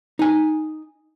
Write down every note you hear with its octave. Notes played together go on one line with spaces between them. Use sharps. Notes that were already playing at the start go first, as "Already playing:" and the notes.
D#4 G#5